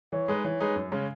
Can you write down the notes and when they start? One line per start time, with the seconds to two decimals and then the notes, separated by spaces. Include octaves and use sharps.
0.12 E3 C#5
0.28 G#3 D#4 G#4 B4
0.45 E3 C#5
0.60 G#3 D#4 G#4 B4
0.76 F#2
0.92 C#3 G#3 C#4